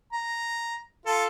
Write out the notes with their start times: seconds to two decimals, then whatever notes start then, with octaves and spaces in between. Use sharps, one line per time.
0.13 A#5
1.06 F4 A4